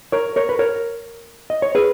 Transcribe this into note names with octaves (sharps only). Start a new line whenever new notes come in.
A#4 C#5
A#4 C#5
B4
A#4 C#5
D#5
C#5
G#4 B4